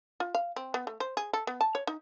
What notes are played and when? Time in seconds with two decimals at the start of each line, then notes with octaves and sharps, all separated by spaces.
0.20 F4
0.35 F5
0.56 C4
0.74 B3
0.87 A3
1.00 C5
1.17 G#4
1.33 A4
1.47 B3
1.61 A5
1.75 C#5
1.87 D#4